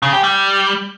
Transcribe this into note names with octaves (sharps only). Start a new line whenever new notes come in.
C#3
G4
G3